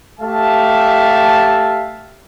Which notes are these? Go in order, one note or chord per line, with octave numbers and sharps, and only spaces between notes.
A3 G4 E5 F5 A5